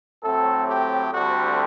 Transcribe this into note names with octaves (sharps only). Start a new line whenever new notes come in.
A2 F#3 A3 C4 A4
G4
D2 D3 G3 C4 F#4